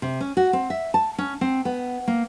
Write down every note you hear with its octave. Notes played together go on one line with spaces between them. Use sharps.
C3
C#4
F#4
C4
E5
A5
C#4
C4
B3
A#3